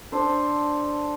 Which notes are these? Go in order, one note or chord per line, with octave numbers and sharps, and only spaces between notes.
D4 A4 C5